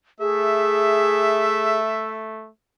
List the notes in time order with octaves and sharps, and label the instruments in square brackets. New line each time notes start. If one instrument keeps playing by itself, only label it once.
[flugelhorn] A3 [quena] G#4 [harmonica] E5